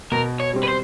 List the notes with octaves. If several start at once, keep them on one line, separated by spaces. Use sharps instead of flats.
B2 A#4
C#5
G3 C4
B4
C5